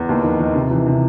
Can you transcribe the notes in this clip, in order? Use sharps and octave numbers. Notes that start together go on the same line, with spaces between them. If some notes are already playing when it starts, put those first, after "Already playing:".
Already playing: E2
D#2
D#3
D#3
C3
E3
C3